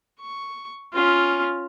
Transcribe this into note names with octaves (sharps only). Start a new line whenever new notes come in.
C#6
C#4 F4